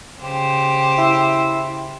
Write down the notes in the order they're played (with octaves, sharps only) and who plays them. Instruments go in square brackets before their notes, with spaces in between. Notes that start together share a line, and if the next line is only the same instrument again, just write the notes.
[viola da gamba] C#3 G4 C5
[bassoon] E4